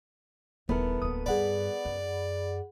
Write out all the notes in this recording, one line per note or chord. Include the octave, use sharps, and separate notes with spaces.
D#1 E3 B3 A4 A#4
D1 A#3 D#6
G2 G#4 D5 F#5 B5
F#2